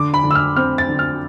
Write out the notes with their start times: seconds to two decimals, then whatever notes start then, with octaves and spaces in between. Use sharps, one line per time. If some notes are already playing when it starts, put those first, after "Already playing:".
Already playing: D3 D6
0.14 B5
0.24 D3
0.31 E6
0.35 F6
0.56 C4 F6
0.78 A6
0.89 D3
0.99 F6